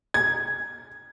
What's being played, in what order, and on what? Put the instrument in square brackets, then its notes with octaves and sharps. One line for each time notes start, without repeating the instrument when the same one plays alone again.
[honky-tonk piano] G#6